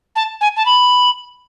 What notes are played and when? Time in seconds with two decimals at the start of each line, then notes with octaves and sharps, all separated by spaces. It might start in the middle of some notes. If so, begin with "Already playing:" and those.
0.16 A5
0.41 G#5
0.56 A5
0.66 B5